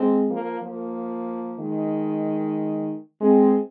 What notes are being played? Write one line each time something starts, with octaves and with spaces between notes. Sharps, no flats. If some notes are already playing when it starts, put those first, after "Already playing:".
Already playing: G#3 C4
F3 A#3
F3 A#3
D#3 G#3
G#3 C4